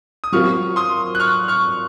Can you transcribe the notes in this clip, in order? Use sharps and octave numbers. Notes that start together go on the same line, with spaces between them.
D#6
F#3 C4 F4 A#4 C#6 F6
C6 D#6
F#6
C#6 F6
C#6 F6